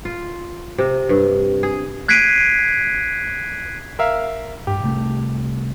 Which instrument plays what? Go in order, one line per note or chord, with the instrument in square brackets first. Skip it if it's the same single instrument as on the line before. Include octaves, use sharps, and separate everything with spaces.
[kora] F4
C3
G2
G#4
[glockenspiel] F#6 G#6 B6 C7 D7 D#7
[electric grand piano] A#4 E5 F5
[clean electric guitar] G2 [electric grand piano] G4
[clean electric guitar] C2 A3